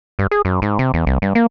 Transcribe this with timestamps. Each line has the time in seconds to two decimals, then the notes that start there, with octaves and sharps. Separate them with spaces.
0.19 G2
0.31 G#4
0.45 F#2
0.62 G#2
0.79 C3
0.94 E2
1.07 C2
1.22 G2
1.35 A#3